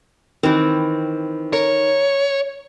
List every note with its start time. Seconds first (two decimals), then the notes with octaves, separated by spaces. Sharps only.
0.43 D#3 E3 C4
1.53 A#4 C#5